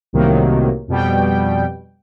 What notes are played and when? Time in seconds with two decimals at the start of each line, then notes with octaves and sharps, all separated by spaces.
0.13 C2 A2 C3 D#3 F#3 A#3
0.88 F2 B2 G3 G5